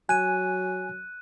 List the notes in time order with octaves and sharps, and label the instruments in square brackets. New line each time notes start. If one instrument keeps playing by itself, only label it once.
[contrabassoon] F#3 [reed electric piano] G#5 [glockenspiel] F#6 D#7